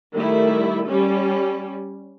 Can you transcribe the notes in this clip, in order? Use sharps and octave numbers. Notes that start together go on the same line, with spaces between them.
D#3 G3 A3 E4
G3 C#4